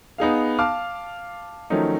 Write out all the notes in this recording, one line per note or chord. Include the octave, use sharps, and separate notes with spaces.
B3 D#4 G#4 F5
F5 A5 D6 F6
D#3 F3 F#3 A3 C#4 D#4